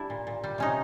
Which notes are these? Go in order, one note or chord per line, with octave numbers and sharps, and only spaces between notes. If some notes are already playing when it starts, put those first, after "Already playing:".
Already playing: G3 D4 E4
A#2
A#2
G3
C3 C#4 D#4